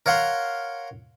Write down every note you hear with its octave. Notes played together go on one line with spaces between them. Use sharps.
A#4 C#5 F5 F#5 A#5 C6